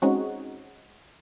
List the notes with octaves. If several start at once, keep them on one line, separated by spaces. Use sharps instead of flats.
G#3 C4 C#4 D#4 F#4